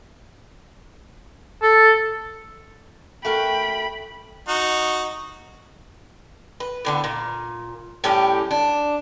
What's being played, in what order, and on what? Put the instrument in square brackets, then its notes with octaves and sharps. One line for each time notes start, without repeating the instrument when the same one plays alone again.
[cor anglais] A4
[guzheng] A3 F#4 A#4 [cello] G5 [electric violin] B5
[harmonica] D#4 F#4
[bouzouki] B4
A2 D3 B3
A#2
A2 G3 C#4 G4
D4